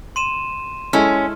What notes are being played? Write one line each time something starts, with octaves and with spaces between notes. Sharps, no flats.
C6 D#7 E7
G#3 C#4 E4 A4 F6